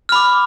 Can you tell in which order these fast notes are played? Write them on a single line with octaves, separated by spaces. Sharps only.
F6 B5 D6